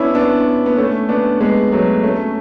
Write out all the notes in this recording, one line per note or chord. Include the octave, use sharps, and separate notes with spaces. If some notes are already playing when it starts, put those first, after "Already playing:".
Already playing: B3 C#4 D4 E4
B3 D4
B3
A3 C#4
B3 D4
G#3 B3
F#3 A3
A3 C#4